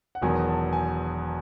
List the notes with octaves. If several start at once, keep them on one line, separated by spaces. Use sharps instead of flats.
F#5
E1 E2 D#3 F#3 G#5
A5
G#5